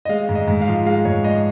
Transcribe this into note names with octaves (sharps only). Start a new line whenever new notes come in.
D#5
G#3 F5
G#2
D#5
G#2
F5
F3
G#3 F5
G#2 C#5
G#2 D#5